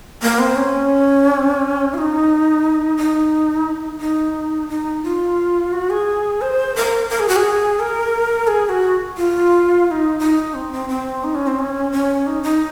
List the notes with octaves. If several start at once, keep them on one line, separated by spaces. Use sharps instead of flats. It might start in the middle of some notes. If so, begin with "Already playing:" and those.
A#3
C4
C#4
F4
D#4
D#4
D#4
D#4
F4
F#4
G#4
C5
A#4
A#4
G#4
F#4
G#4
A#4
G#4
G#4
F#4
F4
F4
D#4
D#4
C4
C4
C4
D#4
C#4
C4
C#4
C#4
D#4
D#4